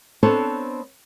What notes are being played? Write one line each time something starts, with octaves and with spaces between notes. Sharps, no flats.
B3 C4 D4 A4 C5 C#5